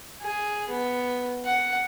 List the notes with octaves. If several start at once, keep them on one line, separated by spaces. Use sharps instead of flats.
G#4
B3
F#5